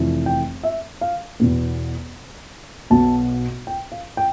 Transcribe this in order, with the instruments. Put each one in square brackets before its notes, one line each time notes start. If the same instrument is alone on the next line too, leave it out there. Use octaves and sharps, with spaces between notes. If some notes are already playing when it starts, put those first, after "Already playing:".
Already playing: [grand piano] F1 F2 E3
G5
E5
F5
E2 B2 B3
B1 B2 B3 A5
G5
F5
G5